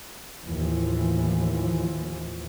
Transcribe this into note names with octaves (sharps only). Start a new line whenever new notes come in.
D#2 A2 E3 F3